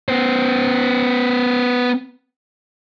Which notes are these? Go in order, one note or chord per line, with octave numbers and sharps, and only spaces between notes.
B3 C5